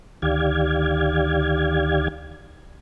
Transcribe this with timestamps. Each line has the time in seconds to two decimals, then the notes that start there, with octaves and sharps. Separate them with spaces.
0.22 D2 D#3 G4 D5 F5 G#6